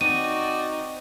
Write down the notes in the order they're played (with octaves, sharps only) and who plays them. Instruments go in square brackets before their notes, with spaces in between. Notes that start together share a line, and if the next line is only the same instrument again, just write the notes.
[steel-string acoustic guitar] C4 [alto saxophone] D#4 [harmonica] F#4 D5 [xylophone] D#7